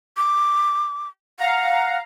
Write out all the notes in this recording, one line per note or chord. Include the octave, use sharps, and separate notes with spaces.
D6
F5 F#5 A#5